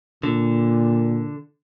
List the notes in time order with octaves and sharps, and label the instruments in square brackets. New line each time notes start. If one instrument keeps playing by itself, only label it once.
[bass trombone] A#2 [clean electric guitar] D3